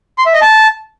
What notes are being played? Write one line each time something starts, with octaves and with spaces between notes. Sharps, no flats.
C6
E5
D#5
A5